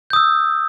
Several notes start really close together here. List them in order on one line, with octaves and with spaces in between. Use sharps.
G6 D#6 E6